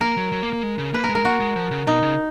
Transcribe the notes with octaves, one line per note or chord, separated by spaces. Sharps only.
A#3 A#4
F#3
F#3
A#3
A#3
G#3
C#3
A#3 B4
A#4
G#3
A#4
A#3 F#4
G#3
F3
C#3
B2 D#4
C#3